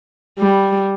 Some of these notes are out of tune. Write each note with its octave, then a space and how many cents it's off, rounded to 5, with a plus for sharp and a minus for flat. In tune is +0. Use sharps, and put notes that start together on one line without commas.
G3 +0